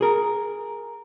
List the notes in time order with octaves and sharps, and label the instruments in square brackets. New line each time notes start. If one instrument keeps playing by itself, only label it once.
[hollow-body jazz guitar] G#4 A#4